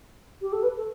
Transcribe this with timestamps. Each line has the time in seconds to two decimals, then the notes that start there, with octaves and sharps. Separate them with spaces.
0.42 G4
0.52 A4
0.63 B4
0.77 A4